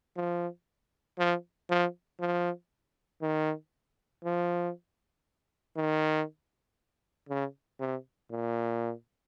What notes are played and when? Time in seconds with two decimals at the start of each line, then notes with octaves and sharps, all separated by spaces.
0.17 F3
1.18 F3
1.70 F3
2.20 F3
3.22 D#3
4.24 F3
5.77 D#3
7.29 C#3
7.80 C3
8.31 A#2